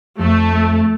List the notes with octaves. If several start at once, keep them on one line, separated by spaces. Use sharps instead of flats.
F2 A3